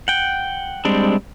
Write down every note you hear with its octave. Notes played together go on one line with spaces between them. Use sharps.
F#5 G5
G3 G#3 C4 D4